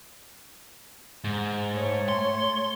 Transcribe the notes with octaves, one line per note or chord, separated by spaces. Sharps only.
G#2
A3 C#5
C6